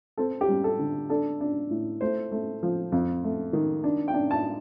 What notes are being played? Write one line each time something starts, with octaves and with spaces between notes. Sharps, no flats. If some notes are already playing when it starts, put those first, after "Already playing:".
C4 A4
G4
G3
A4
D3
D4 A4
D4
A2
A3 C5
A3
F3
F2
A3
D#3
D4
G5
D4
A5